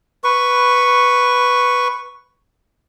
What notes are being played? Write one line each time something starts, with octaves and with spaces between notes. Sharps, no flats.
B4 C#6